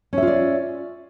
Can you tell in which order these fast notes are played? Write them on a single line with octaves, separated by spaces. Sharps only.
C#4 E5 F4 D5